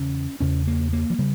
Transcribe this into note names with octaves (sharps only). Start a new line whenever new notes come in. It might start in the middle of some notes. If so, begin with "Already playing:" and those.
Already playing: E2 C#3 C#4
E2 C#3 C#4
A#3
A#3
F3
C#3 G3